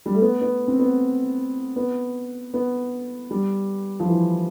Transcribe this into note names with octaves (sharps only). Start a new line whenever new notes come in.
G3
A3
B3
B3
C4
B3
B3
B3
G3
F3
E3